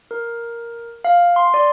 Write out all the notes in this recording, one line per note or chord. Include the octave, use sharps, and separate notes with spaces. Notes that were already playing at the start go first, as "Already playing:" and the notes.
A#4
F5
C6
D5